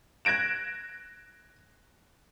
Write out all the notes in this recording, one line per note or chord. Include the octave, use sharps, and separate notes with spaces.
F#6 G#6 A#6 D7 E7